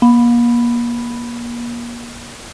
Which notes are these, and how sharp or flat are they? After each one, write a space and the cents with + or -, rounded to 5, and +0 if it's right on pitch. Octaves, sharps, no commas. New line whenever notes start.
A#3 +35 B5 +0